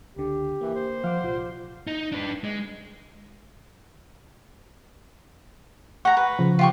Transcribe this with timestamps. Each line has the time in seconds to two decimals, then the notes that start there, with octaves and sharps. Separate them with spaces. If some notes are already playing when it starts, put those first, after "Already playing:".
0.16 C#2 D3 G4
0.61 E3 A#3
0.75 C5
1.04 F3 F5 F#5 D6
1.24 C2 A#2 F4
1.87 D#4
2.12 D4 B4
2.44 G#3
6.05 F#5 A#5 C#6
6.17 B4
6.39 C#3 F3
6.59 F4 G4 C#6